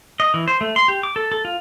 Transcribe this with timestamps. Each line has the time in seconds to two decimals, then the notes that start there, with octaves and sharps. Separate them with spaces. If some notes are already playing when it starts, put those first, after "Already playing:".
0.20 D#5
0.34 E3
0.48 C5
0.61 A3
0.76 C6
0.88 G4
1.03 D6
1.16 A4
1.32 A4
1.45 F4